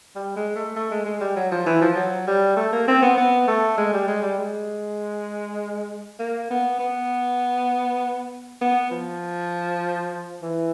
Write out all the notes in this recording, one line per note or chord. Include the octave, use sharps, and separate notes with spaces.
G3
G#3
A3
A3
G#3
G#3
G3
F#3
F3
E3
F3
F#3
G3
A3
A#3
C4
B3
B3
A3
G#3
G3
G#3
G3
G#3
A#3
B3
B3
B3
F3
E3